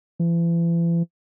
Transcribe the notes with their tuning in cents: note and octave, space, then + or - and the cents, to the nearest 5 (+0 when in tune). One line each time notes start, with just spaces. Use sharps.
E3 +40